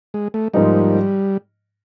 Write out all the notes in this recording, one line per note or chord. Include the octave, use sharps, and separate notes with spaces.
G#3
A3
G#2 F3 G3 A#3 D#4